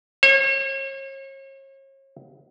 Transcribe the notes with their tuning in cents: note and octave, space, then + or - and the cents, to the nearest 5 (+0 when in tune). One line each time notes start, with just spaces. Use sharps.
C#5 -40